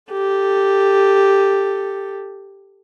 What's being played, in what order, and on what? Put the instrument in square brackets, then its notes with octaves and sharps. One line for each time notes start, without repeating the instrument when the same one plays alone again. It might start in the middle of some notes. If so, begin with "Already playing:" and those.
[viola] G4 A4